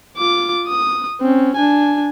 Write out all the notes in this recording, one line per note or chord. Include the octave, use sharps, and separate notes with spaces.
F4 D6
D#6
C4 C#4
D4 G#5